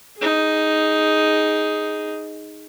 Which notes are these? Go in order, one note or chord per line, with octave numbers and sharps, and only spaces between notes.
D#4 G#4